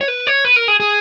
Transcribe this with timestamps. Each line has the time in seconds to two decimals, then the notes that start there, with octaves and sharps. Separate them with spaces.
0.01 C#5
0.08 B4
0.27 C#5
0.45 B4
0.56 A#4
0.68 G#4
0.80 G#4